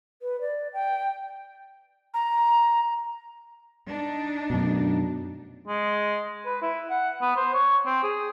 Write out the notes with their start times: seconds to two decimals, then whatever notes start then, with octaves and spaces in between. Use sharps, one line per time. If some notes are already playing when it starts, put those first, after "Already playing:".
0.22 B4
0.41 D5
0.74 G5
2.14 A#5
3.89 D4 D#4
4.50 F#2 B2
5.68 G#3
6.46 B4
6.62 E4
6.90 F#5
7.22 B3
7.36 C5
7.54 C#5
7.86 C4
8.03 G#4